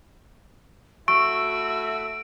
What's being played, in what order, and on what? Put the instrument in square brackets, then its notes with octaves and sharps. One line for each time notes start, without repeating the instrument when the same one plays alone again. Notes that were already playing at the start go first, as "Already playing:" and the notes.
[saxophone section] A3 E4 F#4 [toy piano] C#6 [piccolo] E6 [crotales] D7